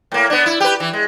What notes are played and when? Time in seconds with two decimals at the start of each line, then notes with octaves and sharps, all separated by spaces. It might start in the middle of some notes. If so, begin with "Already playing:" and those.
0.12 A2 A#3
0.30 B3 D4
0.46 E4
0.60 G4 B4
0.80 E3
0.93 G#3